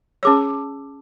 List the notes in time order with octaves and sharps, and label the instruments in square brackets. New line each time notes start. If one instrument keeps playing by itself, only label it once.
[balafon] C#4 G#4 C#5 [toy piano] A5 D6 E6